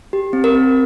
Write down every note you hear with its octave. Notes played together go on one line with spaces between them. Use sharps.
G4
C4
A#4
C4